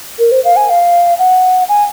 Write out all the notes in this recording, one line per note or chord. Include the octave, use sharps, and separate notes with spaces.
A#4
C5
F5
G#5
F5
F#5
G#5